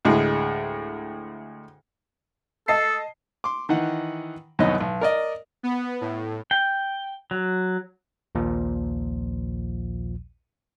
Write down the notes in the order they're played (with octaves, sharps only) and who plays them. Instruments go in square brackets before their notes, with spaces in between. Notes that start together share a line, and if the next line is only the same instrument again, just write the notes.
[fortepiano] D2 A2 G#3
[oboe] A4 [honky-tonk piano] D#5 A5 C7
[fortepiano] C6 D6
D#3 E3 D#4 F#5
C2 F#2 D#3 B3 C#4 D#5
B1
A#4 D5 D#5
[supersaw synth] B3
A2
[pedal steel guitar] G5
F#3
[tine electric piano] A#1 D#2 A#2 F3